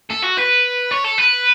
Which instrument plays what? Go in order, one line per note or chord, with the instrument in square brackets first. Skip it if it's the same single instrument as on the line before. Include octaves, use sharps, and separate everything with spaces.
[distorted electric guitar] A4
F#4
B4
C#5
A4
B4